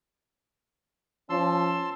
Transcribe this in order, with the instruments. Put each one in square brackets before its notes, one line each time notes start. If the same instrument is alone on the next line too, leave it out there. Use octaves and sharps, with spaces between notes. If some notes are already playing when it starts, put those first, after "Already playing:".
[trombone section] F3 C#4 [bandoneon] A5 C6 E6